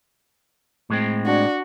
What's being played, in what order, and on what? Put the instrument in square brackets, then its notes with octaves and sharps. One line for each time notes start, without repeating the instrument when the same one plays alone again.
[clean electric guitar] A2 G#3 C4
[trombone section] D4 [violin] F#4